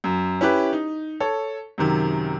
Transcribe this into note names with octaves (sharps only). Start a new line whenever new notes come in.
F#2
C#4 E4 G4 B4
D#4
A4 C#5
F#2 C3 D#3